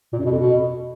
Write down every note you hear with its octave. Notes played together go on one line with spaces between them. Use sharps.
A#2
F#2
B2
F2
B2